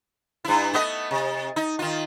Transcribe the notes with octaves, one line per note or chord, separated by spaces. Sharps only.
G2 E4
A3 B3 D#5
C3
D#4
D#3 F4